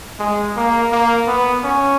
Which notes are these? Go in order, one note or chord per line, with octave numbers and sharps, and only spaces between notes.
G#3
A#3
A#3
B3
C#4